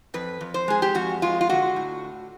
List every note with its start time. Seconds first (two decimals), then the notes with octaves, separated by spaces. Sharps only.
0.14 F2 B4
0.41 F2
0.54 C5
0.68 G#3 G#4
0.82 G4
0.95 F2 F#4
1.22 G#3 F4
1.41 F4
1.49 D3 F#4
1.76 A2